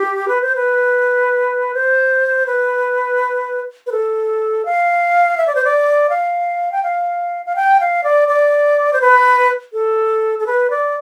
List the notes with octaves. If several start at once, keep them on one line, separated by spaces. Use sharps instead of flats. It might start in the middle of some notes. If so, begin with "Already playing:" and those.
Already playing: G4
B4
C5
B4
C5
B4
B4
A4
F5
E5
D5
C5
D5
F5
G5
F5
F5
G5
F5
D5
D5
C5
B4
A4
A4
B4
D5